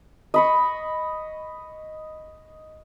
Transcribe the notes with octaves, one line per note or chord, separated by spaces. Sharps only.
D#5 B5 C#6